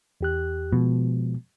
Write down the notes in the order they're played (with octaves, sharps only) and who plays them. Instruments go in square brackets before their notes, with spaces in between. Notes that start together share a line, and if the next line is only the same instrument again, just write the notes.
[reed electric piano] E2 G4 F#6
[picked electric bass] B2 [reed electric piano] F3 G#3